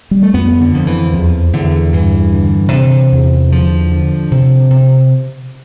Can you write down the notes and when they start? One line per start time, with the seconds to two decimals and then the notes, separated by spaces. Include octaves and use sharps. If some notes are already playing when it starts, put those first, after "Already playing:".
0.11 G3
0.23 A3
0.34 F2 B3
0.61 D3
0.74 F2
0.87 E3
1.13 E2 F3
1.53 E2 D3
1.92 G2 E3
2.33 D3
2.72 C3
3.12 E2
3.52 D3 F3
3.92 D3
4.31 C3
4.70 C3